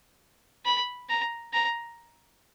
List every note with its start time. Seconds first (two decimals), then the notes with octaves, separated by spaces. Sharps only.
0.66 B5
1.09 A#5
1.53 A#5